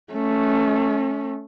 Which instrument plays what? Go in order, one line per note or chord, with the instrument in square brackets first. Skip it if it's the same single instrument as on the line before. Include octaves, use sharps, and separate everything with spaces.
[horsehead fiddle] A3 C#4